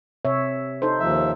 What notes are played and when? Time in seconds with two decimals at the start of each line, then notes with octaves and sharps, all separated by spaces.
0.25 C3 C#5 E5
0.82 D#4 A4 C5
1.00 D#2 F3 E5